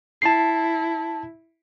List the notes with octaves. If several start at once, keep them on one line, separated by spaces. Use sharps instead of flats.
E4 A5 C7